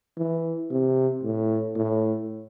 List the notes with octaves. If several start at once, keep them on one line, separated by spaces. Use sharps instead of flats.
E3
C3
A2
A2